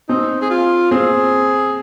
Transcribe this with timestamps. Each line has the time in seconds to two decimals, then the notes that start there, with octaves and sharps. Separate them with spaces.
0.09 C4 D#4
0.42 G#4
0.50 F4
0.91 C4 G#4